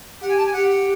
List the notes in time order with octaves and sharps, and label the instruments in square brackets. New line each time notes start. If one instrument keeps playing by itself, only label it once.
[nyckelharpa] G4 [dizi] F#5
[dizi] G#5
A5
G#5
[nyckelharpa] G4 [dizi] F#5
[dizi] F#5